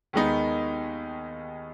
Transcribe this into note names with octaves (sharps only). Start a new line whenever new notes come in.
D#2 D#3 G#3 B3 D#4